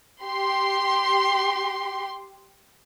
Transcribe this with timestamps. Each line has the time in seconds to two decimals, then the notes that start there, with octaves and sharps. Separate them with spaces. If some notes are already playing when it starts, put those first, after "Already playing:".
0.23 G4 C6